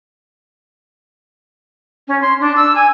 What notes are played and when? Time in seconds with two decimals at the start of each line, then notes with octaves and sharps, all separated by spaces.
2.08 C#4
2.22 C6
2.40 D4
2.56 E6
2.75 G#5